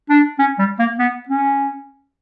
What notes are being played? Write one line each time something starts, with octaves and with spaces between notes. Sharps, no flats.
D4
C#4
G3
A#3
B3
C#4